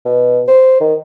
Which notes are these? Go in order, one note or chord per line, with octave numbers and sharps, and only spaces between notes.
B2
C5
D#3